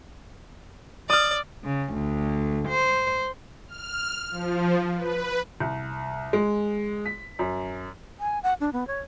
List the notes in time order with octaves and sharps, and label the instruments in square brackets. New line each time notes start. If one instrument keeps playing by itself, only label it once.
[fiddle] D5 [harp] D#6 F6
[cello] C#3
D2
C5
[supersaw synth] F6
F3
B4
[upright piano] C2
G#3
B6
F#2
[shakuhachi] G#5
F#5
D4
B3
C#5